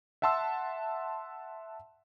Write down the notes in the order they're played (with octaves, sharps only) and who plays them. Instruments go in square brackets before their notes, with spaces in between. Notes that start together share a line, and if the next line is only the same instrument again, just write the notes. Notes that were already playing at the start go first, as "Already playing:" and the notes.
[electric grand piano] E5 F#5 A5 C6 E6